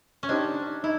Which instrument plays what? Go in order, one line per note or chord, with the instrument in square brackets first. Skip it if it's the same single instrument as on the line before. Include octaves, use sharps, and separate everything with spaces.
[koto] C#4
[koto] D4 [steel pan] D#4 G4 C5 D#5
[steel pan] D#4 [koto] E4